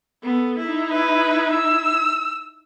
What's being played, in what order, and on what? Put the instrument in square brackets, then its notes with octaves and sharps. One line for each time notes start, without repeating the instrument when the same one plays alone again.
[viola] B3 A4
D#4 E4
[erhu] B4
E6